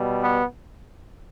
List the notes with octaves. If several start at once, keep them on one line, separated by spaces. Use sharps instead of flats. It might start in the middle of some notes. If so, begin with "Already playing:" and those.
Already playing: B2 G3
B3